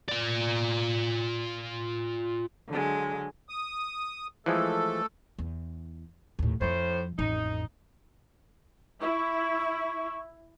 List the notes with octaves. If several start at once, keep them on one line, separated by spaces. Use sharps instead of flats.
F4 D5
D3 F#3 G#3
D#6
E3 F3 G#3 A3 A4
E2
D#2 A2
F2 A2 F3 C5
A1 F2 D#4
E4 C#6